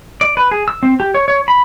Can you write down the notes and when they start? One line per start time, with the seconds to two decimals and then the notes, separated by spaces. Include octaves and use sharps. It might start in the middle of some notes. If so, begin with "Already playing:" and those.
0.21 D5
0.37 B4
0.51 G#4
0.68 E6
0.83 C4
1.00 G4
1.14 C#5
1.28 C#5
1.48 B5